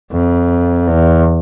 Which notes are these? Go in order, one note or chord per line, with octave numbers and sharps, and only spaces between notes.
F2
E2